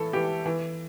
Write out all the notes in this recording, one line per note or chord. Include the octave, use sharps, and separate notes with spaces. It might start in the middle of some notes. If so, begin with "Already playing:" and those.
Already playing: A2 E3 A4
E3 G4
E3